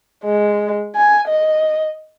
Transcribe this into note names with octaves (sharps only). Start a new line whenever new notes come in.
G#3
G#5
D#5